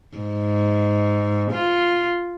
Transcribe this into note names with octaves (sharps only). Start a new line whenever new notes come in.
G#2
F4